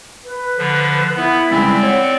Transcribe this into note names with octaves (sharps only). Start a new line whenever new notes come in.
B4
D3 F3
B3 E4
G2 C#3 G#3 C4 D5
C#5 F#5